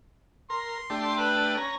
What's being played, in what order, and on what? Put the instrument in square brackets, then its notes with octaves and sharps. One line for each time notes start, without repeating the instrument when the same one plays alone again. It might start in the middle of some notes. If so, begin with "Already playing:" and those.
[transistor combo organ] A#4 [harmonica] C6
[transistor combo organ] A3 D4 G4
[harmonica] B4
[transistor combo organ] C#4 A#5